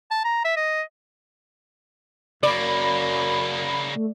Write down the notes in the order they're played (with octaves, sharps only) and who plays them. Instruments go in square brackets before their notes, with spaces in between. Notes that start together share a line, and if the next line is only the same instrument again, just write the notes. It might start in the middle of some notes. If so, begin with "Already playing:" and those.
[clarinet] A5
A#5
E5
D#5
[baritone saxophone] F#2 [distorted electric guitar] C#3 A#3 [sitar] D5 [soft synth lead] B5
[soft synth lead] A3